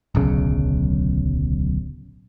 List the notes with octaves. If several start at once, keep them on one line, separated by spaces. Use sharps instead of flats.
D1 B1 C#3